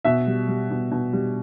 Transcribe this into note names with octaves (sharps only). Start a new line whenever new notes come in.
B2 E5
G3
G3
B2
B2
G3